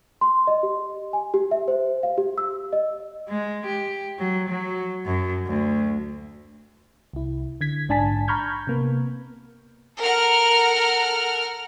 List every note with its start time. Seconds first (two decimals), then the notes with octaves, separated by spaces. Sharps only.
0.21 C6
0.47 D#5
0.63 G4
1.13 G#5
1.34 G4
1.51 E5
1.68 C5
2.03 F5
2.18 G4
2.38 E6
2.73 D#5
3.29 G#3
3.66 G4
4.19 F#3
4.49 F#3
5.06 F#2
5.47 D2
7.13 C2 E4
7.61 D3 G#6 B6
7.89 A#1 G#2 D4 G#5 A5 B6
8.28 A#5 B5 C#6 F6 G6 G#6
8.67 C3 A#3 B3
10.00 A4 A#4 F#5 F6